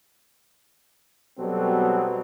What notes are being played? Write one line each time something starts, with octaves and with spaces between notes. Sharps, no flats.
B2 F#3 G3 B3 C4 A4